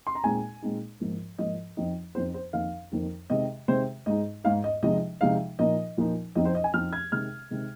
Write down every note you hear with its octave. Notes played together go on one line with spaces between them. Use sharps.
C6
A#5
A#2 G#3 C4 D#4 G#5
A#2 G#3 C4 D#4
G#2 F3 A#3
G#2 F3 A#3 D#5
F2 F3 C4 D#4 D#5
F2 F3 C4 D#4 C5
C5
F2 D#3 A#3 D#4 F5
F2 D#3 A#3 D#4
C3 D#3 G#3 C4 D#5
C3 D#3 G#3 C4 C5
G#2 G#3 D#4 D#5
G#2 G#3 D#4 F5
D#5
C3 F3 G#3 D#4 D#5
C3 F3 G#3 D#4 F5
A#2 F3 A#3 D#4 D#5
A#2 F3 A#3 D#4
F2 F3 C4 D#4 D#5
C5
D#5
G#5
F2 F3 C4 D#4 F6
G#6
C3 D#3 G#3 F6
C3 D#3 G#3